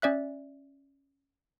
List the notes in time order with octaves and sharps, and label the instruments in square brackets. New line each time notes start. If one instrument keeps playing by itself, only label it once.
[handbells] C#4 D5 E5 F#6